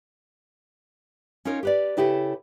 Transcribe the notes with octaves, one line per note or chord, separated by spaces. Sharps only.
C#4 D#4 F4 A#4 C#5
G4 B4 D5
C#3 E4 G4 A4 B4